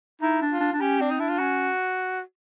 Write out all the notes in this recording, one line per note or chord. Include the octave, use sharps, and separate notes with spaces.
D#4 E4
D4
F4
D4
D4
C#4 G4
C4 D4
D#4
D4 E4
F4
C#4 F#4